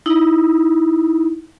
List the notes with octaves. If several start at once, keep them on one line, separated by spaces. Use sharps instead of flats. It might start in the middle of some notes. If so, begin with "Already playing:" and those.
D#4 E4